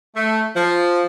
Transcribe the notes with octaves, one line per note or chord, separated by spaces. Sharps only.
A3
F3